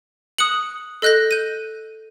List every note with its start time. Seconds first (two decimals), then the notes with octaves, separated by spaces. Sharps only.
0.38 D#6 F#6 C#7 F#7
1.02 A4 D#5 F#6 G6 A#6
1.31 G6 D#7